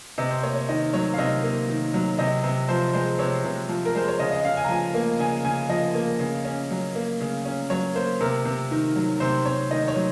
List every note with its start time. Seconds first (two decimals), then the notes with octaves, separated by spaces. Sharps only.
0.18 C3 D#5
0.31 C5
0.43 A#3 C#5
0.55 C#5
0.69 D#3 D#5
0.94 F#3 C#5
1.14 F5
1.18 C3 D#5
1.43 A#3
1.69 D#3
1.94 F#3
2.19 C3 D#5
2.44 C3
2.69 F3 C5
2.94 G#3 C5
3.19 C3 C#5
3.44 C3
3.69 F3
3.85 A#4
3.95 G#3 C5
4.08 C#5
4.19 C#3 D#5
4.31 D#5
4.44 C#3 F5
4.57 G#5
4.64 A#5
4.69 F3 G#5
4.94 A#3
5.19 C#3 G#5
5.45 C#3 G#5
5.69 F3 D#5
5.94 A#3
6.19 C#3
6.45 C#4
6.71 F#3
6.95 A#3
7.21 C#3
7.45 C#4
7.70 F#3 C#5
7.95 A#3 C5
8.21 C3 A#4
8.45 C3
8.71 D#3
8.96 F#3
9.20 C3 C5
9.46 C3 C#5
9.71 D#3 D#5
9.88 C#5
9.96 F#3